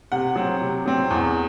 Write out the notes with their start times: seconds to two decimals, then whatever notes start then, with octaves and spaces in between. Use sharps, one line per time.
0.12 C3 F#5
0.36 F#3 C4
0.61 C3
0.86 F#3 C4
1.10 E2